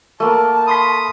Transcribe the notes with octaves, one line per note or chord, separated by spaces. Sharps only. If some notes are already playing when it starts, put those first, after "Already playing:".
A3 A#3 A5
B5 C6 D#6 B6